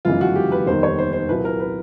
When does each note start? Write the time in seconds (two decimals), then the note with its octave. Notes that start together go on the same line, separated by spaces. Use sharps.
0.05 G1 F#2 C#3 E3 G#3 F4
0.21 F#4
0.36 G4
0.52 B4
0.67 F1 D#2 D#3 G3 B3 C5
0.83 C#5
0.99 C5
1.13 C5
1.29 C2 A#2 F#3 A#3 B4
1.45 A#4
1.60 B4